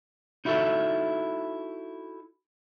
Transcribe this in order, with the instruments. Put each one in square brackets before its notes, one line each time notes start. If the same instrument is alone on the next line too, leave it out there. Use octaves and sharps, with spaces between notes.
[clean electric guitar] D#4 E4 F#4 G#4 A4 E5